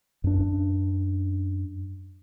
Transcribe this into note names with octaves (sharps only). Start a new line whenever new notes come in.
F#2 D4